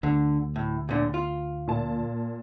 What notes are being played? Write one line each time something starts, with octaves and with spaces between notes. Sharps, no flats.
D2 D3
A2
A#2 D3
F4
A#2 A5